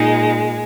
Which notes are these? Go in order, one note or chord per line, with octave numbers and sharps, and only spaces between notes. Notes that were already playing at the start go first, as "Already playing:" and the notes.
Already playing: A#2 G#3 D#4